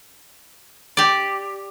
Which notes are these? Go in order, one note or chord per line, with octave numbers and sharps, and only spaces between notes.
G4 D5